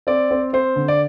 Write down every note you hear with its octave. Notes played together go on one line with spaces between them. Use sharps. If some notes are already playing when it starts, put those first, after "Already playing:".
C4 D5
C4
C4 C5
D3
D5